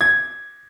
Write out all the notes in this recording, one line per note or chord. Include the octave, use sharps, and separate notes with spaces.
G#6